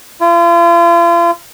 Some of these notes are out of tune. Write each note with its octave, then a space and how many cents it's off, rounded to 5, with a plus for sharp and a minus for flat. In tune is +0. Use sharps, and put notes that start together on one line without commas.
F4 -40